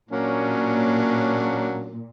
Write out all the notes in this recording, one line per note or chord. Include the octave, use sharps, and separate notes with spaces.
A#2 F#3 A#3 C#4 D4